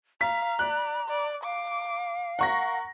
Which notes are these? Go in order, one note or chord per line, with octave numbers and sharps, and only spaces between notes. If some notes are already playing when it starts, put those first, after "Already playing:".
F5 A#5 B6
D5 F#6
D5
F5 D6
A#4 F#5 C#6 A#6